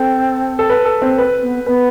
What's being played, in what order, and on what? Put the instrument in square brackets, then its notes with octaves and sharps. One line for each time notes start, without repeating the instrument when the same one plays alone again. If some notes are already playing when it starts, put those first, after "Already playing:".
Already playing: [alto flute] C4 [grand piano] A4
[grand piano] A4
B4
A4
C4
B4
[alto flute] B3
[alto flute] B3 [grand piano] B4